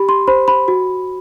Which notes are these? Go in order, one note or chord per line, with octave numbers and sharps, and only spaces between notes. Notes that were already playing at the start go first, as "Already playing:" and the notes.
Already playing: G4 B5
C6
C5 B5
B5
F#4